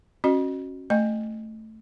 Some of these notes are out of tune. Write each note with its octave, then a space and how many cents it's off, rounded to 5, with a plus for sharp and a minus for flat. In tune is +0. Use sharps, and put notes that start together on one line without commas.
C#4 -25 F#4 +0 D#5 -25
A3 +0 D#5 -20 G#5 -15